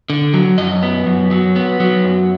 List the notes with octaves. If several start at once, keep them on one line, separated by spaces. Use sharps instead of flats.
D3
F#3
F#2 D#5
B3
F#2
F#3
B3
F#3
F#2